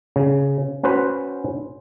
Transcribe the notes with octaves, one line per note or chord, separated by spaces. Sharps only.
C#3
C#4 F#4 B4 C5 F#5